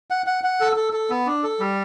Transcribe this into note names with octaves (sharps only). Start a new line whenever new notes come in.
F#5
F#5
F#5
A4
A4
A4
B3
D4
A4
G3